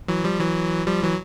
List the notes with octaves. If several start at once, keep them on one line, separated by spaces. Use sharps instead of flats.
E3 F#3
F3 G3
E3 F#3
F3 G3
E3 F#3